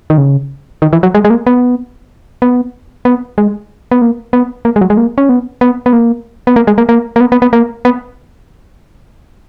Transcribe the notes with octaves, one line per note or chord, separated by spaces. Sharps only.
D#3
C#3
D#3
E3
F#3
G#3
G#3
A#3
B3
B3
B3
G#3
B3
A#3
B3
A#3
G#3
F#3
G#3
A#3
C#4
B3
B3
B3
A#3
B3
A#3
G#3
A#3
A#3
A#3
B3
B3
B3
A#3
B3